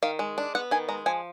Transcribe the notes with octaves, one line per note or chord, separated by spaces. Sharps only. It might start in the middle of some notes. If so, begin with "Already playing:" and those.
D#3 F5
G#3
D4
B3 F#5
D#3 G#5
G#3 A#5
F3 G#5